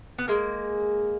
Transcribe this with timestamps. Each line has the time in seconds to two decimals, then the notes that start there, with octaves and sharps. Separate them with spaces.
0.18 B3
0.28 G#3 A#3